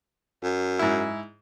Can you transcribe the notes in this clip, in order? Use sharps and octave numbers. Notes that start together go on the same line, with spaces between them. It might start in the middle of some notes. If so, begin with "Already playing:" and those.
F#2
G#2 E4